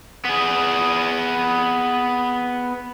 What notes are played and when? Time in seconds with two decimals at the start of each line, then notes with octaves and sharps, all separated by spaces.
0.25 B3 G#4